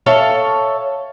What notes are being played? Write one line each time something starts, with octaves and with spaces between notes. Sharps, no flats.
A4 C#5 E5 F5